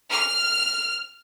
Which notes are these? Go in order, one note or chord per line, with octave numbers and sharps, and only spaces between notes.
F6